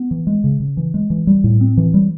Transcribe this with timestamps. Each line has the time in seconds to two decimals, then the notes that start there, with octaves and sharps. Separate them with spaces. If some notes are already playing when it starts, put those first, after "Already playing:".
Already playing: B3
0.11 E3
0.27 G#3
0.44 C#3
0.60 C#3
0.77 E3
0.94 G#3
1.10 E3
1.27 G3
1.44 A2
1.61 C4
1.77 E3
1.94 G3